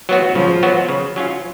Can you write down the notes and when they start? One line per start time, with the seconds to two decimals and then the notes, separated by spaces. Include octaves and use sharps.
0.09 F#3 B3 F#4
0.35 C#3 F3
0.63 F#3 B3 F#4
0.89 C#3
1.16 F#3 C#4 F4